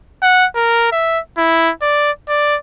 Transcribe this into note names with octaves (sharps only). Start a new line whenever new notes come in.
F#5
A#4
E5
E4
D5
D5